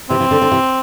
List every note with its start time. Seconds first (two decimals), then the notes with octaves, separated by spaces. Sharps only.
0.10 C3 E3 C4
0.20 C3 E3
0.31 D3
0.42 D3
0.52 C3 E3